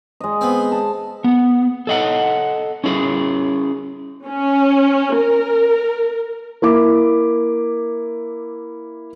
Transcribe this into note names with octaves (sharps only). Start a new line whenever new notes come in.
G#3 D#5
B3 C4
A5
B3
A4 D#5 F#5
C#4 E4 G#4
C#4
A#4
A#3 E4 D6